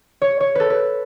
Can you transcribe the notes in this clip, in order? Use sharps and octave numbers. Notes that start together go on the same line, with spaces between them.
C#5
C#5
A4 B4
B4